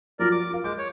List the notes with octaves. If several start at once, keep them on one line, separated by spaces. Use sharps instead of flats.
F3 F#3 F4 A#4 D5
D6
A#4 F5
G#3 D6 G6
C#5